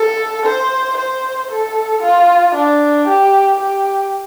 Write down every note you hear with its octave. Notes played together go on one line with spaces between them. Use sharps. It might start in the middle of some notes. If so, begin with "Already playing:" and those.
Already playing: A4
C5
C5
A4
F4
D4
G4
G4